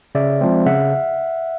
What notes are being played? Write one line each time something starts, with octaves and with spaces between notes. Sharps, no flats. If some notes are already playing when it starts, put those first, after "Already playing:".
C#3 D5 E5
F3 G#3 C4
C#3 E5 F#5